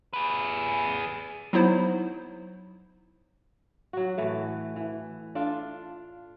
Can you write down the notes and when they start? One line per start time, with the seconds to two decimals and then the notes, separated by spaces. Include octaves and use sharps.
0.13 G#4 B4
1.53 F#3 B3 D#4 E4 C5
3.93 F#3 F#4
4.18 A2 E3 A3
4.76 E3
5.35 D4 F4 A4